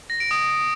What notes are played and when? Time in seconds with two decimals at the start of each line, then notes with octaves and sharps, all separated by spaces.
0.10 A#6
0.20 D7
0.31 D#6